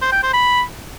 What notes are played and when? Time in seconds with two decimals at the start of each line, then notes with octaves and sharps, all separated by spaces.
0.02 C5
0.12 G5
0.23 C5
0.33 B5